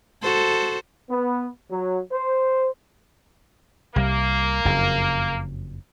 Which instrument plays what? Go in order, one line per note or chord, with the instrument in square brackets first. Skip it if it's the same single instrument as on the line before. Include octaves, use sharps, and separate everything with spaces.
[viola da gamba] F#4 A4 C5
[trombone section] B3
F#3
C5
[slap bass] C2 G3 [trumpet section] A#3
[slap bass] F#1 F2 C#3